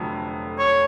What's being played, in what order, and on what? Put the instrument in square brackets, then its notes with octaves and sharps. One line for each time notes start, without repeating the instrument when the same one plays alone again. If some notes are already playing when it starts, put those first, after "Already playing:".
Already playing: [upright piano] F1 F2 D3 F#3
[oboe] C#5